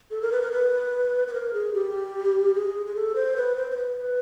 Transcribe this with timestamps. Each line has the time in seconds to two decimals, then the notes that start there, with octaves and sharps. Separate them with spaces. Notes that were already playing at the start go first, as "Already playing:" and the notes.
0.11 A4
0.22 A#4
0.32 B4
0.42 A#4
0.51 B4
1.28 B4
1.34 A#4
1.53 G#4
1.74 G4
2.55 G#4
2.86 G#4
2.95 A4
3.16 C5
3.36 B4
3.56 C5
3.71 C5
3.76 B4